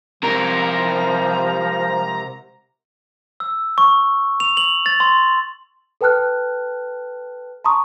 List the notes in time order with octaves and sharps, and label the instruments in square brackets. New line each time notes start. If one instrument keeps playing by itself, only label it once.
[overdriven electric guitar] C3 A#4 [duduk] F3 [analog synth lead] A#5
[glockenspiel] E6
C#6
F7
F#7
A6
C6
[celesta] A4 B4 G5 A5 F6 F#6
A5 A#5 C6 C#6 D#6